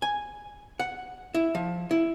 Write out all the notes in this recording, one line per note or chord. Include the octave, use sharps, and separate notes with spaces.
G#5
F#5
E4
F3
E4